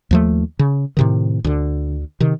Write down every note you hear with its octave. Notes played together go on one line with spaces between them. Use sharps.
D#2 F3 A3
C#3
A2 C3 D#3
D2 D3
C3 D#3